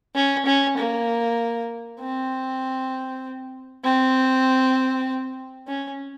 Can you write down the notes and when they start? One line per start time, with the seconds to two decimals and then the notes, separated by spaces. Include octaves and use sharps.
0.15 C#4
0.46 C#4
0.77 A#3
2.00 C4
3.84 C4
5.67 C#4